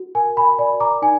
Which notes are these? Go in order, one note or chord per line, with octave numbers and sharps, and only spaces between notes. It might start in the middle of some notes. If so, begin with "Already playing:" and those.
Already playing: F#4
A#4 G#5
G#5 B5
D5 G#5 B5
A#5 D6
D#4 G#5